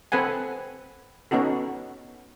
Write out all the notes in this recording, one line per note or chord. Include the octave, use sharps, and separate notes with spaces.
C4 A4 B4 F#5 G#5
B3 C#4 D#4 F#4 A4